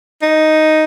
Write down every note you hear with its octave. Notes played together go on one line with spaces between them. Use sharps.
D#4